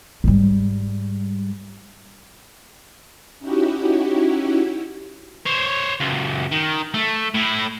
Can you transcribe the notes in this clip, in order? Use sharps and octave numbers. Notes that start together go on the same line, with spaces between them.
G#2 G3
C#4 D#4 E4 F#4 G4
C5 C#5
C#2 F#2
D#3
A3
A2 E4